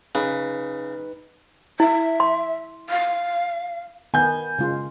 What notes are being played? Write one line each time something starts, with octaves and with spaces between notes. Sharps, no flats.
C#3 D#4 B4
E4 E5
C6
F5
D#3 B3 G#5 G6
C#3 G#3 F4